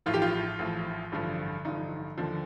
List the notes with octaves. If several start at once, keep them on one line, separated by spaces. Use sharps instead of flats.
A1 A2 F3 F4
G4
F4
A1 A2 F3
A1 G2 D3 F3
A1 G2 D3 F3 D#4
D#2 D3 F3